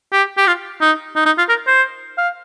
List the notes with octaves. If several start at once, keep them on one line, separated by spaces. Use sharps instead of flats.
G4
G4
F4
D#4
D#4
D#4
F4
A#4
C5
F5